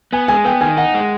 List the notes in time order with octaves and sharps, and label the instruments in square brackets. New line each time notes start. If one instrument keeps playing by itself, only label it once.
[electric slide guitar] B3 [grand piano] G#5
[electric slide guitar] G#3 [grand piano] G#5
[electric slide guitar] B3 [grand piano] G5
[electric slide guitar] D#3 [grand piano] G#5
[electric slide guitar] D#4 [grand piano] F#5
[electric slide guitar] G#3